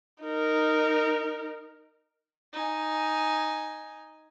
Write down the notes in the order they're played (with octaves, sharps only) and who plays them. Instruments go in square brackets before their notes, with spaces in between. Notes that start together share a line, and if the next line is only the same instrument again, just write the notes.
[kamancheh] D#4 A#4
[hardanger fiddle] D#4 G#5